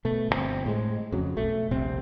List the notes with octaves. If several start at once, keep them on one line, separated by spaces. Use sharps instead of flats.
B2 A3
G1 C3 C4
A2 G#3
F2 C#3 F#3
B1 A3
D#1 A#1 C3 C4